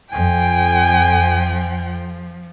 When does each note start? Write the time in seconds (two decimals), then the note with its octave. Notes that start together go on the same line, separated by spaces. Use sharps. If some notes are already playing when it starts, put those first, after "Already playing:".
0.12 F2 F3 G5 G#5